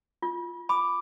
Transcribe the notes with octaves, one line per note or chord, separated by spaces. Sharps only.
F4
B5 D6